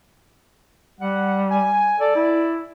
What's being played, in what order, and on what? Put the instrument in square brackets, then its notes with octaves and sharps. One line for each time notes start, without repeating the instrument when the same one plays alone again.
[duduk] G3 [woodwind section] F#5
[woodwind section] G#5
[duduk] A4 [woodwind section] D5
[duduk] E4